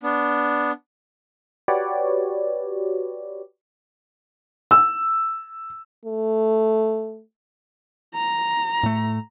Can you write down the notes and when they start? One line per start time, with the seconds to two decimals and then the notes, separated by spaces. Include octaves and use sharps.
0.03 B3 D4
1.68 F#4 G4 B4 C#5 D5
4.71 E6
6.05 A3
8.15 A#5
8.83 A2 A3